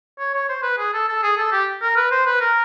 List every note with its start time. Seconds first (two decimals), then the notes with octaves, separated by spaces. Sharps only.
0.19 C#5
0.34 C#5
0.49 C5
0.63 B4
0.78 G#4
0.93 A4
1.08 A4
1.23 G#4
1.37 A4
1.52 G4
1.82 A#4
1.96 B4
2.11 C5
2.26 B4
2.41 A#4